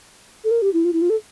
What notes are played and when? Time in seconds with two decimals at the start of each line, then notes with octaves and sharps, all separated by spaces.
0.44 A4
0.51 A#4
0.62 G4
0.73 E4
0.85 F4
0.93 E4
1.02 F4
1.10 A4